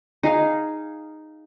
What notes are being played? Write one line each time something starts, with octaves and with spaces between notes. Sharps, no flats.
D#4 G#4 F5